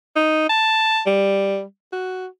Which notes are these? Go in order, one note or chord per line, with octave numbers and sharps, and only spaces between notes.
D#4
A5
G3
F#4